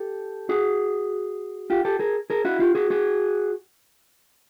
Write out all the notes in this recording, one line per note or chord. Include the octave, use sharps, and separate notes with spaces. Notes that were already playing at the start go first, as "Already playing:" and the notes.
Already playing: G4 A4
F#4 G#4
F4 G4
G4 A4
G#4 A#4
G#4 A#4
E4 F#4
F4 G4
F#4 G#4
F#4 G#4